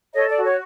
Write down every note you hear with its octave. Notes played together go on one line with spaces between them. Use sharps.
A4 C#5 D#5
D5
F#4
C#5